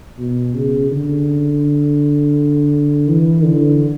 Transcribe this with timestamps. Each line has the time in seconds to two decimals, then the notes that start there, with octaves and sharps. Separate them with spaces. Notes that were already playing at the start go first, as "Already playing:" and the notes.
0.19 B2
0.55 C#3
0.91 D3
3.08 E3
3.44 D3